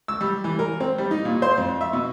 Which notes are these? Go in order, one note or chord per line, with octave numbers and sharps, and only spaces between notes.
E6
G3
E3
A#4
C4
G3
D#4
A#2
C5
F2
E5
B2